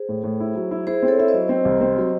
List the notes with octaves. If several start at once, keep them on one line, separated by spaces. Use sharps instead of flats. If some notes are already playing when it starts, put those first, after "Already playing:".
Already playing: G#4 C5
A2
A2
E4
F#3
E4
E4 G#4 C5
C4
A4 C#5
E4 E5
C5 D#5
F#3
C4
C2
C4
F#3